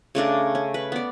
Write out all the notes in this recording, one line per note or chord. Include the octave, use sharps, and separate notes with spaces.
C#3 A3 D4 A#4
C#4
B4
B3 D5